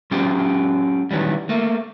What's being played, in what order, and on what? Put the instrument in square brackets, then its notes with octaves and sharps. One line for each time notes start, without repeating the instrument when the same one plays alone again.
[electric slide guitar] F#3 C#4 F4 G4
D#3 E3 F#3 G3
A3 A#3